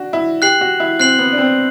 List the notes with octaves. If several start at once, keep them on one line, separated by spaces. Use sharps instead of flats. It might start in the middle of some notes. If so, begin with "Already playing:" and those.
Already playing: D4 F#4
E4
G4 F#6 C7 F#7
F#4
E4
C4 F#6 C7 F#7
B3
D4
C4